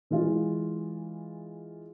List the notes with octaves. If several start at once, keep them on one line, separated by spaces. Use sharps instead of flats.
E3 G#3 F4